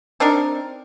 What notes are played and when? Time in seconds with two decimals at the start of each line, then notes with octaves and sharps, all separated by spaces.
0.20 C4 D4 D#4 A#4